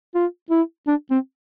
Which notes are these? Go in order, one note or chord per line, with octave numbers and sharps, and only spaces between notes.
F4
E4
D4
C4